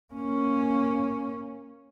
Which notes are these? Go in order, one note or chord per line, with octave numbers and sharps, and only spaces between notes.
A#3 C#4